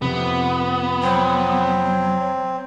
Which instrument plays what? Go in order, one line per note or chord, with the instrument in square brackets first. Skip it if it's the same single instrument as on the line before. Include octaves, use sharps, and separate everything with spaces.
[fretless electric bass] F2 C3 [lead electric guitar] B3
[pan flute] F#3 [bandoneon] C4